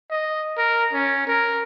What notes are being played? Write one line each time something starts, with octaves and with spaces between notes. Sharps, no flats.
D#5
A#4
C#4
A#4